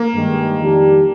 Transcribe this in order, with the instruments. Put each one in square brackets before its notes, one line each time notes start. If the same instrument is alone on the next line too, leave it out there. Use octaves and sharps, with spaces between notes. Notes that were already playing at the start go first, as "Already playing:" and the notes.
Already playing: [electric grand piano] A#3
[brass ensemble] G2 D#3 G#3
F2 D#3 G3 D4 G4